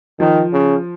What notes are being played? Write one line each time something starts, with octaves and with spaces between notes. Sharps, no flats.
D#3 F3
C#3